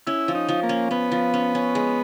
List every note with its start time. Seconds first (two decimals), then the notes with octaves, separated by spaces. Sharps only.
0.07 C#4 E4
0.28 F3
0.35 D#4
0.49 F3
0.63 A#3
0.69 C#4
0.91 B3 C#4
1.12 F3
1.34 C#4
1.55 C#4
1.75 G#3